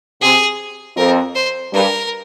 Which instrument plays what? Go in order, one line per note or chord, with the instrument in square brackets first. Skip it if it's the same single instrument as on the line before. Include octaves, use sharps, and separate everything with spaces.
[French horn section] C3 [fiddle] G#4
[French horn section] F2 [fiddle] A#4
[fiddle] C5
[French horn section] G2 [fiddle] A#4